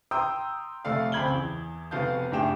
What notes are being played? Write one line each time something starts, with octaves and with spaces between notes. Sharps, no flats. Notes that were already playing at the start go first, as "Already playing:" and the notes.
G5 A#5 C6 D#6 E6 G6
F1 A3 A4 D5 F5
C#2 C4 B5 G#6 F#7 G7
E2
F1 B3 F#4 F5 A5 G6
F#1 G2 A3 G#4 G5 E7